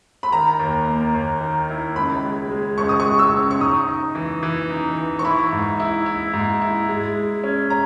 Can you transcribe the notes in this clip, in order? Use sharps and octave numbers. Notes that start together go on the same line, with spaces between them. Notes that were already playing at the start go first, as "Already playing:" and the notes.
B5
D#3 A#5
D#2
A#3
D#2
D#3
E4
C#2 B5
G#3
G#3
C#2 C#6
D#6
C#6
G#3
E6
C#3
C#6
D#4 D#6
D#4
E3
E3
D#4
E3
C#6
E4 B5
G#2
E4
E4
G#2
E4
G#3
G#3
C#4
A#5